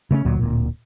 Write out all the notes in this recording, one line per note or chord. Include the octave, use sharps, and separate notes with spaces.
C#3 A3 C4 C#4
D2 A#2 F#3
D1 A#2